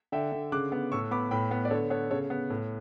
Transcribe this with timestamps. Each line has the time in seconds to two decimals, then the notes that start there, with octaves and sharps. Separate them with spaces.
0.12 D3 E5 G5
0.32 D3
0.52 C#3 D6 F#6
0.72 B3
0.92 A2 C#6 E6
1.11 B3 B5 D6
1.31 A2 G5 B5
1.51 B3
1.65 D5
1.71 D3 A4 C#5
1.90 B3 A4 C#5
2.10 C#3 A4 C#5
2.30 B3
2.50 A2